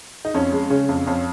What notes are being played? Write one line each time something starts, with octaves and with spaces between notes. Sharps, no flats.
D#4
F2 C#4
G#3
C#3 C#4
F2
F2 C#4